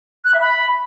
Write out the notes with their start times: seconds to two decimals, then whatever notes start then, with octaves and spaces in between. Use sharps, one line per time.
0.25 F#6
0.33 E5
0.41 B5